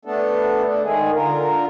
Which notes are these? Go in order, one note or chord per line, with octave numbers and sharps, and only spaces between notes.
A3 B3 D4 A4
A3 D4
D#3 G#3 G#4
D3 F4 A#4